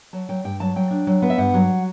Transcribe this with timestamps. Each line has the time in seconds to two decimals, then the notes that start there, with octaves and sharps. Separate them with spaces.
0.13 F#3 A5
0.29 F#3 G5
0.44 G2 G5
0.60 F#3 A5
0.76 F#3 G5
0.91 D4
1.07 F#3
1.22 B3
1.30 E5
1.38 G2 F#5
1.54 F#3